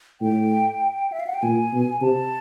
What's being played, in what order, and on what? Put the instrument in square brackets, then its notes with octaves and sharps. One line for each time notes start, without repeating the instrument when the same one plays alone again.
[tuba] A2 [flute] G5
[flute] E5
F5
F#5
G5
[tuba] A#2 [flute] G#5
[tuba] B2
[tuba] C3 [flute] A5